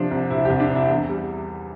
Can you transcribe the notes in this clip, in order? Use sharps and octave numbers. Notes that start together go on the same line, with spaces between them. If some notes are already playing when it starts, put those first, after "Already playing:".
Already playing: C3 F3 D4
C2
C3 E4
C2 G4
D4
C3
E4
E2
G3